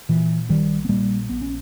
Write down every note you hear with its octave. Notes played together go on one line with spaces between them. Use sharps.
A#2 E3
A#1 D#3 G3
B3
A#2 G3 A#3
A#1 B3
C#4